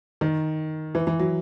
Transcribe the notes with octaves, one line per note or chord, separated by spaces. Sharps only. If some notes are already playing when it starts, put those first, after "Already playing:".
D#3
E3
E3
F#3